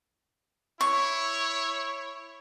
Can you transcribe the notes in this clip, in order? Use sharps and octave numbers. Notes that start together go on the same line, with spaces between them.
E4 C#5 C#6